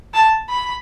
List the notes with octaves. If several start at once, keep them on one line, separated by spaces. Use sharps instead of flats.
A5
B5